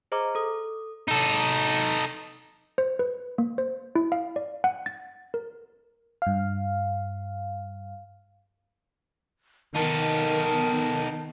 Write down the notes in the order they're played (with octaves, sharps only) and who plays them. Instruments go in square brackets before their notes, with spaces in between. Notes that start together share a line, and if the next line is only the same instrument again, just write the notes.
[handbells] G#4 C5 D#5 A#5 D6
A4 D#6
[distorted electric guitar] D#4 A4
[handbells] C5
B4
A#3
C5
E4
F5
D5
F#5
A6
A#4
[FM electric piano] G2 F5
[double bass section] D#3 B3 [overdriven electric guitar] D#4 A4 [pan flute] A#4 [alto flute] A5